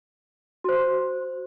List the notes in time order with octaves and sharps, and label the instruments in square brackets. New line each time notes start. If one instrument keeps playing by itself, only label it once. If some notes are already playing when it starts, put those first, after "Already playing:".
[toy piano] F#4 C5